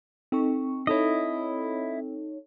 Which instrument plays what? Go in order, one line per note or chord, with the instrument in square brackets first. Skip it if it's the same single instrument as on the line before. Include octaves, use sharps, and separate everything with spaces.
[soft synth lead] C4 [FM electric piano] D#4 A4 C#6
[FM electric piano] D#4 A4 C#5 [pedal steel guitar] E4 D#5